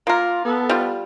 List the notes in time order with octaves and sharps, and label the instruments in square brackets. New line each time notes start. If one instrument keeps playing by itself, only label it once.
[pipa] A#3 A#4 [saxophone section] F4
[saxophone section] B3 A4
[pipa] G3 F4